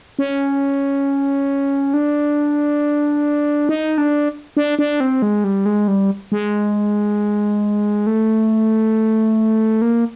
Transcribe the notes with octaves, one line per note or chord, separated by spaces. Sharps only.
C#4
D4
D#4
D4
D4
D4
C4
G#3
G3
G#3
G3
G#3
A3
A#3